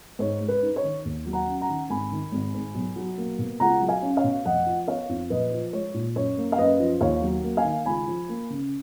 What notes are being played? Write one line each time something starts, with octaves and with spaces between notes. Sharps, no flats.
G#2 C#5
G#3
B4
D#4
C#5
D#3
D#2
F#3
F#5 A#5
C#4
F#5 A#5
D#3
G#1 G#5 B5
D#3
G#1
G#2
B1
F#3
A#3
B2
C#2 F#5 A#5
F#3
F5 G#5
C#4
C#5 F5
B2
F1 D#5 F#5
F3
B3 C#5 F5
F2
A#1 B4 D#5
F3
G#3 C#5
A#2
F#2 C#5
A#3
F5
F#2 B4 D#5
F3
D#2 C#5 F5
F#3
A#3
F5 G#5
D#3
C#2 G#5 B5
F3
A#3
C#3